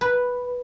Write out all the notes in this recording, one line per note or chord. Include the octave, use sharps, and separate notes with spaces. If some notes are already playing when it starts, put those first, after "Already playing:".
B4